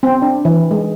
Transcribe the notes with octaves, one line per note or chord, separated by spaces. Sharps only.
C4
D4
E3
G#3